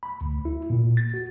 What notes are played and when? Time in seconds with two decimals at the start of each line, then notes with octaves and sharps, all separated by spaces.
0.03 B5
0.21 D2
0.45 E4
0.70 A#2
0.97 A6
1.14 F#4